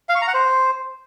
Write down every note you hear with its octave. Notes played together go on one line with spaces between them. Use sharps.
F5
C#6
A#5
F#5
C5